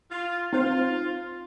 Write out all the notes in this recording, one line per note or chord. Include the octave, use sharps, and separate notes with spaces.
F4
C4 D#4 F4 C5